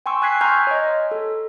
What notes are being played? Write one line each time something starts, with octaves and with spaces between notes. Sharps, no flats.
G5 G#5 C6 C#6 E6
G#5 F#6 G#6 B6 C7
G#5 A#5 C6 C#6 F6 G6
C#5 D#5
A4